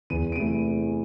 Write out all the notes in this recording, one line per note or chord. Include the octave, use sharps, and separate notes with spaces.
E2 D#7
D7
C3 E3 A3 D#7